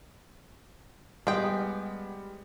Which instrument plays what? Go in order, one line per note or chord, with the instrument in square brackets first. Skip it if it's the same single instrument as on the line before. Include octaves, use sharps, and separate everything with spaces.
[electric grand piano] G3 [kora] G#3 [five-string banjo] B3 G5